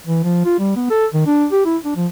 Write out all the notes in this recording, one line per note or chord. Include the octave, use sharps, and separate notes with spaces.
E3
F3
F4
G3
B3
A4
D#3
D4
G4
E4
D4
F3